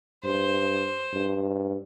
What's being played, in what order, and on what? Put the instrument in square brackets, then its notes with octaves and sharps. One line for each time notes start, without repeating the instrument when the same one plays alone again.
[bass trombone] G2 [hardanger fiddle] C5
[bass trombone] G2